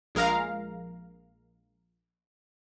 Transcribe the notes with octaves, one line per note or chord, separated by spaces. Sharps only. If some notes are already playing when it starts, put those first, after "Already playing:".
A#1 G#3 A#4 F5 A#5